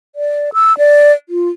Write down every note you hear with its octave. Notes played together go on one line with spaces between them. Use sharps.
D5
E6
D5
F4